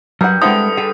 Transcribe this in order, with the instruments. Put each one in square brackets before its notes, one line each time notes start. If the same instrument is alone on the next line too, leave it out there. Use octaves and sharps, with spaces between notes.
[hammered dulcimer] G2 [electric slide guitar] F#3 [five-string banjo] A#4 F#5
[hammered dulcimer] D3 [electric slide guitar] G#3 G5 [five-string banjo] C4 E4 [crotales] D#6
[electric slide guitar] G#4 A4 B4 [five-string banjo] G5